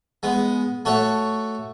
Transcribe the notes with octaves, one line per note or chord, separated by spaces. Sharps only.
G#3 B3
A3 F#4 C#5